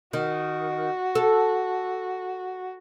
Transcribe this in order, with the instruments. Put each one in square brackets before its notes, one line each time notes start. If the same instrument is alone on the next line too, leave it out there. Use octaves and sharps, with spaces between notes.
[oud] D#3 [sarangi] F#4
[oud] A4